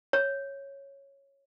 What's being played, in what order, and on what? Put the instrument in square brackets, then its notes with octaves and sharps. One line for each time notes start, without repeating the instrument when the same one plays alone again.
[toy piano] C#5